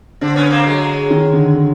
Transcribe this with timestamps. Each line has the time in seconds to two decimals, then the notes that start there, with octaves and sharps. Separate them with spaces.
0.21 D3 C4 D4
0.36 B3 C#4
0.50 A#3 C4
0.66 F#3 G#3
1.10 D#3
1.33 D3
1.55 D3